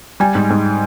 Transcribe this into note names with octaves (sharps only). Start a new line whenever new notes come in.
G3 G#5
G#2
G#2